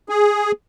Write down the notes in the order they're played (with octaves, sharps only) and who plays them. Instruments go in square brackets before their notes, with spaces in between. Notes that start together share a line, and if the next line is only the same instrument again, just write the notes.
[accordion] G#4